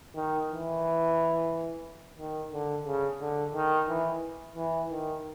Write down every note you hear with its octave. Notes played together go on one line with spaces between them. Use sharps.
D#3
E3
D#3
D3
C#3
D3
D#3
E3
E3
D#3